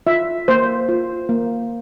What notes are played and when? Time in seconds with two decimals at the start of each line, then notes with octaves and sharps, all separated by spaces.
0.07 F4 E5
0.48 A#3 C5
0.89 F4
1.29 A#3